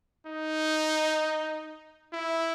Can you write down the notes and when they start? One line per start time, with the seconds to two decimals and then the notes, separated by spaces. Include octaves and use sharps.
0.27 D#4
2.13 E4